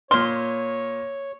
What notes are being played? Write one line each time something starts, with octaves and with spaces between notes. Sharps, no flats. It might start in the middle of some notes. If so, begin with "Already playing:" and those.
A#2 C#5 C6 F6